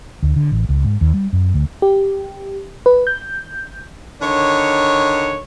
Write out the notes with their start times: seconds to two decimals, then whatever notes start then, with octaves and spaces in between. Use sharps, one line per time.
0.22 D2
0.36 D3
0.52 A1
0.69 C#2
0.84 G#2
1.01 D#2
1.14 G3
1.33 F#2
1.54 D2
1.82 G4
2.86 B4
3.07 G6
4.22 D3 D#3 C#5